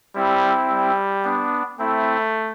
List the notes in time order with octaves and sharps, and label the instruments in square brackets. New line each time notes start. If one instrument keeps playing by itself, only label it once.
[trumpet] G3 [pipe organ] C4 E4
[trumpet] G3
[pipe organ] B3 D4
[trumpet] A3 [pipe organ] C4 E4